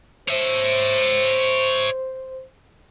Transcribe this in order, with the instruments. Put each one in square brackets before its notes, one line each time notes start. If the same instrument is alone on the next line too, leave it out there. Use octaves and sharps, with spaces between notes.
[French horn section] C5 [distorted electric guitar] C#5 E5